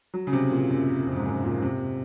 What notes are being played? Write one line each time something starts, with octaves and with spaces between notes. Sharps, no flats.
F#3
C#3
C3
A#2
F#2
F2
G#2
F#2
A#2
C3